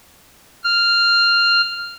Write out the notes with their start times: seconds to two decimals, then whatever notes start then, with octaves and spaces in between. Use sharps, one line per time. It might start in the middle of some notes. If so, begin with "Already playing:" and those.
0.64 F6